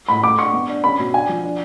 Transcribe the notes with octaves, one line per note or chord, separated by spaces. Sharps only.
A2 B5
A3 D6
D4 C#6
B3
D4
C#4 B5
B2
D4 G#5
F3
D4